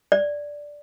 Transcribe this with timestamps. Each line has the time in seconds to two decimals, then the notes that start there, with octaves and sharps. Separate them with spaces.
0.12 D5